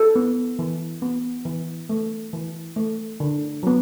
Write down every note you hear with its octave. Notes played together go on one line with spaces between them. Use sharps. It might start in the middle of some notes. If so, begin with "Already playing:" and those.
Already playing: A4
B3
E3
B3
E3
A3
E3
A3
D3
F#3 B3